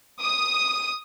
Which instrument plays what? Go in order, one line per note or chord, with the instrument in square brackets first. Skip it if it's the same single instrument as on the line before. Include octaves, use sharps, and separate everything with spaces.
[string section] D#6